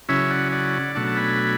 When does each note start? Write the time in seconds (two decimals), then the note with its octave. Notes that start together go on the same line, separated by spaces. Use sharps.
0.09 C#3 F#3 C#4 E4 C#5 E5
0.30 D5 F#5
0.52 D5 F#5
0.95 B2 F#3 A3 D4 F#5 A5
1.07 A5
1.17 G#5 B5